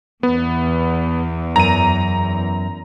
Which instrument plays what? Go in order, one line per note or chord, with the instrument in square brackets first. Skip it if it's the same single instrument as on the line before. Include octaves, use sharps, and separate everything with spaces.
[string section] E2 [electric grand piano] B3
[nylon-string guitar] F#2 [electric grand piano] A#5 D#7